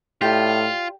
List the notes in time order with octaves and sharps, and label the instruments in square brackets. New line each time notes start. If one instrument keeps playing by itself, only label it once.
[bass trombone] A2 [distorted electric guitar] F4 [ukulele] G4 D5 G5